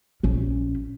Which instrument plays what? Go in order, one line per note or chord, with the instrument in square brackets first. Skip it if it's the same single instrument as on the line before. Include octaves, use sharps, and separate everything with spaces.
[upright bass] A#1 C#4